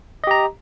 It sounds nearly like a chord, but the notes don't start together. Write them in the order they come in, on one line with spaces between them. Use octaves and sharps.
D#5 G4 A#5